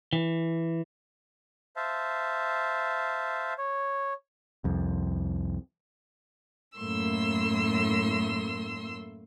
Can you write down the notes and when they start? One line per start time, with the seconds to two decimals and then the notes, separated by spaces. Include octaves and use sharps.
0.13 E3
1.76 C5 E5 F5 A5
3.58 C#5
4.64 C2 F2
6.77 F#2 A2 A3 A#3 C6 E6